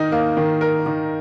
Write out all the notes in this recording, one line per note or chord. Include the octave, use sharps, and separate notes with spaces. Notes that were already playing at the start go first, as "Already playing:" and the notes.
Already playing: D#3 D#4 A#4
A#3
D#3
A#4
D#3